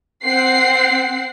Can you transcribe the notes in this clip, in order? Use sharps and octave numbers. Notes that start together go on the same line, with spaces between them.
C4 F#5 C7